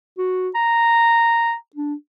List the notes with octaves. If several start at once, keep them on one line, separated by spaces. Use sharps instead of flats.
F#4
A#5
D4